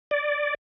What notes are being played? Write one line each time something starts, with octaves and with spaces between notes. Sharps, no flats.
D5